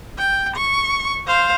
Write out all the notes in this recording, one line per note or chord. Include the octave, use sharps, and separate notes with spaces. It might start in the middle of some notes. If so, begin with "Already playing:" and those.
G5
C#6
C5 F5